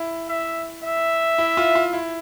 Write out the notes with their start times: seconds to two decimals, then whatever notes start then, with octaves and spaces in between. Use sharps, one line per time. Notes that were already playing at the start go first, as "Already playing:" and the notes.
Already playing: E4
0.29 E5
0.83 E5
1.38 E4
1.57 F4
1.75 F4
1.93 E4